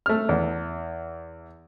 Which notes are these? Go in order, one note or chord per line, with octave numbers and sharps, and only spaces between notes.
A3 F6
E2